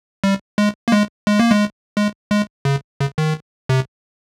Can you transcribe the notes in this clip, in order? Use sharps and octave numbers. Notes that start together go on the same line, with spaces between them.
G3
G#3
A#3
G#3
G#3
A#3
G#3
G#3
G#3
C#3
C#3
D#3
C3